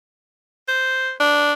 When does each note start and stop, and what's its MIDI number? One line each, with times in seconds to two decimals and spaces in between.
0.68 1.11 72
1.20 1.53 62